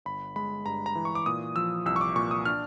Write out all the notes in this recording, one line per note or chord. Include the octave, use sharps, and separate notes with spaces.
G1 B5
G#3 B5
G2 A#5
A#5
E3
C#6
D6
A#2 D#6
F3 E6
C2 E6
C#6
D6
A#2 C#6
D#6
D4 F6